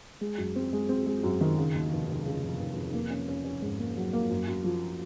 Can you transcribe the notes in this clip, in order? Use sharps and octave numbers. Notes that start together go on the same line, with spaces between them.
G#3
F#2
C4
G#3
C4
G#3
F#2
D#3
C#3
D#2
F1
F1
C#3
F1
F1
F1
A#3
C#4
C#4
C#4
G#2
A#3
F#3
A#3
F#2
F#2
F3